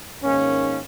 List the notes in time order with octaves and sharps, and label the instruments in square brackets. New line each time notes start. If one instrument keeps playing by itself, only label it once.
[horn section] G#2 D#3 A#3 C#4